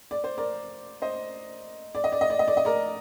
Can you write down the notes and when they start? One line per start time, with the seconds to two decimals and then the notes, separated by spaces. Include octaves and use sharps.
0.11 D5
0.24 C5
0.38 A#4 D5
1.02 C5 D#5
1.95 D5
2.04 D#5
2.12 D5
2.21 D#5
2.30 D5
2.39 D#5
2.48 D5
2.57 D#5
2.65 A#4 D5